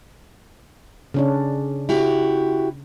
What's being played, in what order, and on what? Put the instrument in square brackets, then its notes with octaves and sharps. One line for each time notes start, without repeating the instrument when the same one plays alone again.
[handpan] C#3 C#4 D4
[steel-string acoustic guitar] E4 F#4 G4